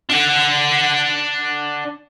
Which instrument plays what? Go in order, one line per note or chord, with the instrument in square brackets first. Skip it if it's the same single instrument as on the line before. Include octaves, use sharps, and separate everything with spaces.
[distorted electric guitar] D4 F#5